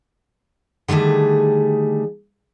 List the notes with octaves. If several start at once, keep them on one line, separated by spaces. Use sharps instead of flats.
D3 D#3 G3 A3 G#4